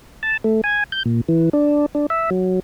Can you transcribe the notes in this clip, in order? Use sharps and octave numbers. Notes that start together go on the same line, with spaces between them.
A5
A3
G#5
G6
A#2
E3
D4
D4
E5
F#3